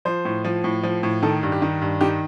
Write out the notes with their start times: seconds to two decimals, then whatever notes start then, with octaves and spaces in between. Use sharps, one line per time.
0.05 F3 C5
0.25 A2
0.44 F3
0.64 A2
0.83 F3
1.03 A2
1.22 D#3 A4
1.43 G2
1.52 G4
1.62 D#3
1.81 G2
2.01 D#3 G4